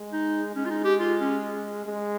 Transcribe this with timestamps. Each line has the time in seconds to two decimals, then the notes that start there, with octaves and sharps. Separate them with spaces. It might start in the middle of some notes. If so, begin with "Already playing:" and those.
Already playing: G#3
0.12 D#4
0.55 G#3 C#4
0.65 F4
0.70 D#4
0.84 G4
1.00 F4
1.21 C#4
1.85 G#3